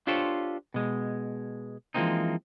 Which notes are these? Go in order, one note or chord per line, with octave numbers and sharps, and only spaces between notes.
D4 F4 G4 A4 C5 C#5
B2 G#3
E3 F3 G#3 A#3 C4 D#4